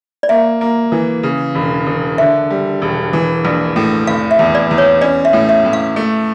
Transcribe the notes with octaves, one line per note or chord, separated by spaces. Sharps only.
D5
A#3 E5
A#3
E3
C#3
E1
E1
D3 E5
G3
E1
E3
A#1
A2
F1 F5
E5
E2
D5
E2
C#5
C#4 D5
E5
A2
E5
A2
F5
A3